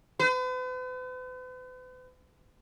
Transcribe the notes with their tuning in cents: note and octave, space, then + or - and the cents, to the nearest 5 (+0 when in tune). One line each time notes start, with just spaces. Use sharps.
B4 +45